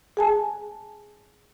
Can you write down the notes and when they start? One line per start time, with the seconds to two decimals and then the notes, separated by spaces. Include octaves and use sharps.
0.17 G#4 G#5 A5